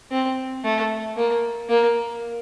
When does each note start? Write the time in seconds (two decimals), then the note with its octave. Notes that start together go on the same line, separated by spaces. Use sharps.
0.11 C4
0.64 A3
1.17 A#3
1.69 A#3